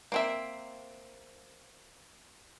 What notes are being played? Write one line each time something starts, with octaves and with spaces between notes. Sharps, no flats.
A#3 C4 E5